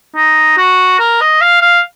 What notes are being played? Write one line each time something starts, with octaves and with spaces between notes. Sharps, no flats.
D#4
F#4
A#4
D#5
F5
F5